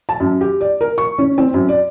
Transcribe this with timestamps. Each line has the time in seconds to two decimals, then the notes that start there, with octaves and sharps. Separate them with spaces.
0.09 A5
0.20 F#2
0.41 G4
0.61 D5
0.81 A#4
0.98 C#6
1.19 C#4
1.38 C4
1.54 F#2
1.69 D5